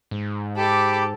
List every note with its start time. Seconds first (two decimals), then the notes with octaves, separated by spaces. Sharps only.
0.11 G#2
0.57 G4 A4 B5 D6